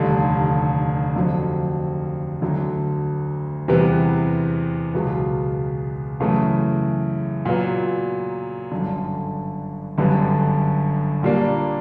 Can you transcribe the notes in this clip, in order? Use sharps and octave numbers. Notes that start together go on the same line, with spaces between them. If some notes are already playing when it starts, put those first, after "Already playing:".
Already playing: F1 D#2 D3 G3
F2 D3 F#3
D2 D3 F#3
E2 C3 E3 G3 B3
C#2 B2 F#3 B3
F#2 C#3 E3 A3
A#2 F#3 B3
G1 F#2 D3
G1 F#2 D3 G3 B3
A#2 G3 A#3 D4